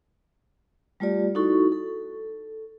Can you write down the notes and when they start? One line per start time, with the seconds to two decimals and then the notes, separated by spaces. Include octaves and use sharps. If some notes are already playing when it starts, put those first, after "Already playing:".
1.00 G3 A3 F4 G4 D5
1.35 D#4 E4 F#4 A4 C#6
1.72 A4